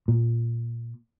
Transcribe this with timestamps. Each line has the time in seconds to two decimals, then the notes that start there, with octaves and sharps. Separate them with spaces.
0.08 A#2